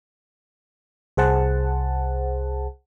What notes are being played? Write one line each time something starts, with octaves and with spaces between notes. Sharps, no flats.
C2 G#4 C5 F#5 A5